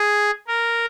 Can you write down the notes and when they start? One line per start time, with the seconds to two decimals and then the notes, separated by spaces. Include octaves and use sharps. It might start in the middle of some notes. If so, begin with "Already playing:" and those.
Already playing: G#4
0.48 A#4